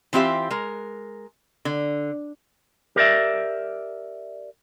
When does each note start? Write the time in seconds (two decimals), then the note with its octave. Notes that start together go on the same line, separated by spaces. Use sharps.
0.13 E3 C4 F4 G4 E5
0.50 G#3 A#4
1.65 D3
2.96 G4 A#4 D5 E5